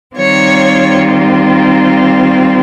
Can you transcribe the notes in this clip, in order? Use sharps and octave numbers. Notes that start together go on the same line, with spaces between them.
D#3 G3 C4 F4 C#5